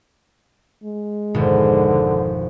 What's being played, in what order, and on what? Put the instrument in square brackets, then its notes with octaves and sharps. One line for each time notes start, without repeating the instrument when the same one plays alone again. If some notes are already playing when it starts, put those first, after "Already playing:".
[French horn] G#3
[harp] G#1 F2 B2 [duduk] D3